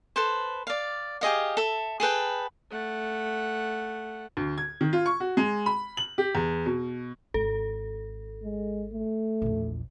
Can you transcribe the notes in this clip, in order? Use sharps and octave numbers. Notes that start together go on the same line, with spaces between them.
A4 B4 C5
D5 F5
G4 G#4 D#5 F5
A4 E5
G#4 A4 B4 G5
A3 F#5
D2
G#6
D#3
F4
C#6
F#4
G#3
B5
F#7
G4
E2
B2
G#1 A4
G#3
A3
A#1 E2